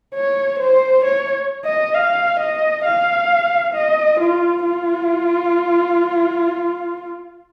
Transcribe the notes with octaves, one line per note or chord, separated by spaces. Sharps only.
C#5
C5
C#5
D#5
F5
D#5
F5
D#5
F4
F4